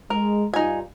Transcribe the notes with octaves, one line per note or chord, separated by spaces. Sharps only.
G#3 A#4
G2 D#4 F4 G#5